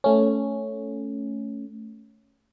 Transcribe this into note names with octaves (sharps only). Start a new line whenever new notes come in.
A3 C#4